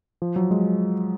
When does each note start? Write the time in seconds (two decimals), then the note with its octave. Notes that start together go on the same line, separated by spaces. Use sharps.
0.22 F3
0.36 F#3
0.51 G#3